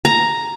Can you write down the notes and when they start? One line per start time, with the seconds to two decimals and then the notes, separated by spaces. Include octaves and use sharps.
0.05 A#5